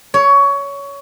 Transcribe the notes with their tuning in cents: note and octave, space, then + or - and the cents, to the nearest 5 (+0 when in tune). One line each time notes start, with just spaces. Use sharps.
C#5 +20